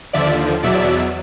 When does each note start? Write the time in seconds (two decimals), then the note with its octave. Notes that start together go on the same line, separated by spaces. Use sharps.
0.13 D#2 D3 F3 D5 E5
0.63 E2 B2 F#3 D5 E5